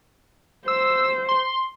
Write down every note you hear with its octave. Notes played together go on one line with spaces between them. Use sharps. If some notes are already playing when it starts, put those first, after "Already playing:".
C5 E6
C6